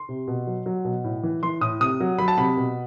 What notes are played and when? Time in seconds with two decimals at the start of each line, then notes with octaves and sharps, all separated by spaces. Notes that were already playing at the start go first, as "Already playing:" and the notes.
Already playing: C6
0.09 C3
0.27 B2
0.47 F#3
0.66 F#3
0.85 B2
1.04 A2
1.23 E3
1.43 E3 C6
1.61 A2 D#6
1.80 C3 D#6
2.00 F#3
2.19 F#3 B5
2.28 A5
2.37 C3 B5
2.57 B2